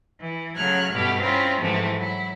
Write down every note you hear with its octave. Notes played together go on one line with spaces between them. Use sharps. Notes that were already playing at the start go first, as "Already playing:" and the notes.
E3
C#3 F#3 A3 F6 F#6 G#6
G2 B2 A3 E4 G4 F6
C4 C#4 E4 F4 A#4
G#2 C3 E3 F3 A3
F#3 E4